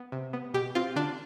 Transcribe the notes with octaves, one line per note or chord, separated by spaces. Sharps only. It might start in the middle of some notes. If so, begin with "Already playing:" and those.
Already playing: B3
C3
B3
B2 G4
C4 F4
D3 D4